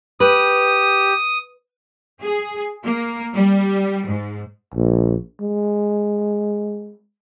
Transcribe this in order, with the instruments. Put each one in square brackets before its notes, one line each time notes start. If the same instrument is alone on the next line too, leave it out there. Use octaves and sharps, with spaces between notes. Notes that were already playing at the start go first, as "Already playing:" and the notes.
[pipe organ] G4 [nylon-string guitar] B4 [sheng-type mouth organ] D#6
[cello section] G#4
A#3
G3
G#2
[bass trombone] A#1
G#3